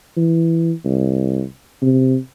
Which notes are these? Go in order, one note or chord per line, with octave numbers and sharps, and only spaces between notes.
E3
C2
C3